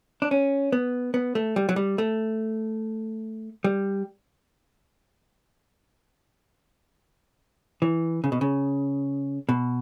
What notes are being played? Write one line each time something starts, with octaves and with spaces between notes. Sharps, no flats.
D4
C#4
B3
B3
A3
G3
F#3
G3
A3
G3
E3
C#3
B2
C#3
B2